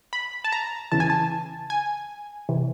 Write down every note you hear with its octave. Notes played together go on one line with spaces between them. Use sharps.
B5
A5
A#5
E2 C#3 E3 A5
G#5
A5
G#5
C3 E3